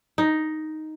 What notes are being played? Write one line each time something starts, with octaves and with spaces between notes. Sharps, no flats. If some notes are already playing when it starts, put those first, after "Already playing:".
D#4